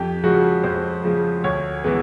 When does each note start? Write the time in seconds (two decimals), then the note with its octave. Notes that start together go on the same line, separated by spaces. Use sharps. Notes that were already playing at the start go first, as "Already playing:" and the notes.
Already playing: F2 G4
0.23 C#3 F3 G#3 F#4
0.64 F2 C5
1.03 C#3 F3 G#3
1.44 D2 C#5
1.84 E3 G#3 B3